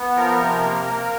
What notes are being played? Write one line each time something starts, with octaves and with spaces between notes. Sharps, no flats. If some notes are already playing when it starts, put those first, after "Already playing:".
Already playing: B3
F3 A#4
C3
A#3
A#3